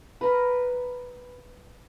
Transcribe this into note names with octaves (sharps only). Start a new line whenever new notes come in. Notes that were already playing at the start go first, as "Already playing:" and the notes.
A#4 B4